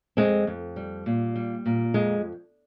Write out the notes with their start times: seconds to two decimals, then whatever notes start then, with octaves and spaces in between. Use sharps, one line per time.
0.17 F2 G#3 C4
0.47 F2
0.76 G3
1.06 A#2
1.36 G3
1.66 A#2
1.94 F2 G#3